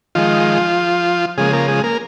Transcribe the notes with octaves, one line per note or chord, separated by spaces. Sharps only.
D#3 F3 G#3 F4
C#3 F3 G#3 A#3 G#4
A#3 A#4
G#3 G#4
A#3 A#4